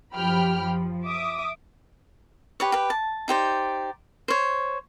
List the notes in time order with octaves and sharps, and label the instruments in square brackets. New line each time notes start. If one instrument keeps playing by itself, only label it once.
[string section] F#2 F3 G4 G5 B5 F6
F3
E5 D6 D#6
[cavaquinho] G4 B4 C#5
G4 B4
A5
D#4 G4 C5 D5
C5 C#5